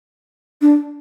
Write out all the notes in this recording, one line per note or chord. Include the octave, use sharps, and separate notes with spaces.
D4